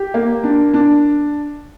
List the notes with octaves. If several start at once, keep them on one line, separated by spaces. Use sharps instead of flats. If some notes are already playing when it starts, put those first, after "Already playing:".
Already playing: G4
A#3
D4
D4